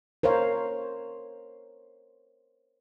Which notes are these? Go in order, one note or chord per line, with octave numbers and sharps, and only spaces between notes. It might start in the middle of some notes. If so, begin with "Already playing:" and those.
A#4 C5 C#5 F5